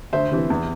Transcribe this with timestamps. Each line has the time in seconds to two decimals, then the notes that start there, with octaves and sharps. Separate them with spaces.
0.13 D2 C5 E5
0.31 C3 E3
0.50 E2